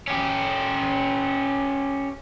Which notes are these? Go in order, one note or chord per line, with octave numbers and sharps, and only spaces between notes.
C#4 G4